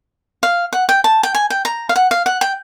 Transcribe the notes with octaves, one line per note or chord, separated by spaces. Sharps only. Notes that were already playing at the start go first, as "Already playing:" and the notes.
F5
F#5
G5
A5
G5
G#5
G5
A#5
F5
F#5
F5
F#5
G5